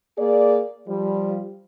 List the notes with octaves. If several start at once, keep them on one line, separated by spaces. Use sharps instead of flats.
A#3 G#4 D5
F3 G3